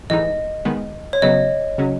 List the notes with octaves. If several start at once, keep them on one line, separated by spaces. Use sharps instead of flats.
A2 E3 G#3 D#4 D#5
D#3 G#3 B3
C#5
C#3 F#3 B3 D#5
C#3 F#3 C#4